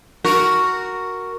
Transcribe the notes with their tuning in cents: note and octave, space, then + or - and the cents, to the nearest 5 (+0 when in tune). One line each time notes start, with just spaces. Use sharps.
F#4 +0 A#4 +0